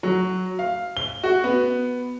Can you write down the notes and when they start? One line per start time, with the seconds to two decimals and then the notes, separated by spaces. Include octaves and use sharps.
0.03 F#3
0.59 F5
0.97 G7
1.23 F#4
1.44 B3